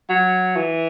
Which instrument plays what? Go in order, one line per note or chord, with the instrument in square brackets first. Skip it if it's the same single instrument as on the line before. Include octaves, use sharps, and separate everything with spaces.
[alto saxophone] F#3
E3